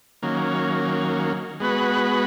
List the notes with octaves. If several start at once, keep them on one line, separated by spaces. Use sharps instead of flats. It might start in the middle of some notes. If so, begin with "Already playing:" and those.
D#3 F#3 A#3 C#4
G#3 B3 F#4 B4